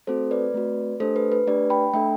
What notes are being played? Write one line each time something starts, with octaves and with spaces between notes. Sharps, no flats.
A3 C4 F#4 A4 C5
B4 D5
A3 C4 F#4
A3 D4 G4 A4 C5
B4
B4
A3 D4 G4 B4 D5
G5 B5
A3 D4 A4 E5 G5